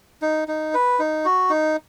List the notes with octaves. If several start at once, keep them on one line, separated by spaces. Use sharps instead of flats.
D#4
D#4
B4
D#4
F#4
D#4